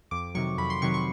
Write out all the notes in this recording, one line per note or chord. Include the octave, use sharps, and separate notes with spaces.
F2 D6
C3 D#3 F#3 C#6
F2 B5
C6
C3 D#3 F#3 C#6
C#6